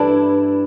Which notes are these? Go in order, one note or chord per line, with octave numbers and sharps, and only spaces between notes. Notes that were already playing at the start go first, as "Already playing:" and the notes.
Already playing: G2 E3 A3 D4 E4